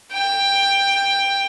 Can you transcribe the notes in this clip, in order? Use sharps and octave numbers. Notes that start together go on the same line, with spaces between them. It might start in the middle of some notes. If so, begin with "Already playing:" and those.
G5